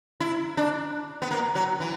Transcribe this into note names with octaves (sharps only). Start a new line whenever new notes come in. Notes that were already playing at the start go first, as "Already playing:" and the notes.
E4
D4
B3
A#3
F#3
E3